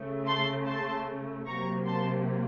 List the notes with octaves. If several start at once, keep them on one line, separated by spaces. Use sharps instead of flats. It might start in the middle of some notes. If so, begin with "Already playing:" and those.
Already playing: C#3 A3
A5 C6
A5 C6
C3 F#3 A#3 A#5 C#6
A5 C6